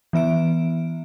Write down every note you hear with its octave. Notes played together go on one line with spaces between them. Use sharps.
E3 B3 E5 D7